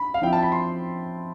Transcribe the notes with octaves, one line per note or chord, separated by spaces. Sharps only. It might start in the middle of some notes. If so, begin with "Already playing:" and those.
Already playing: B5
F5
F3 C4 E4 G5
A5
B5
C6